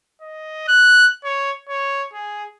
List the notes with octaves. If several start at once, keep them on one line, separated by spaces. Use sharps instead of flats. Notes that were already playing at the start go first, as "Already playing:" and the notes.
D#5
F#6
C#5
C#5
G#4